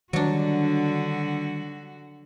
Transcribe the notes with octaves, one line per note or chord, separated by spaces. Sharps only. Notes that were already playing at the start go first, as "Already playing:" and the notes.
D3 D#3 F#3 G3 D4 F#4